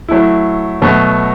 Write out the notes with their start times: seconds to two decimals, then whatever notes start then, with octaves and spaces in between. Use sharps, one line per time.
0.08 F#3 A3 E4
0.82 B2 F#3 A3